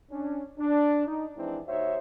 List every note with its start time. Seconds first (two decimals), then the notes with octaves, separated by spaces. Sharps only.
0.11 C#4 D4
0.59 D4
1.07 D#4
1.37 E3 F3 G#3 C4 D4 E4
1.67 D#2 D#4 F#4 C5 C#5 E5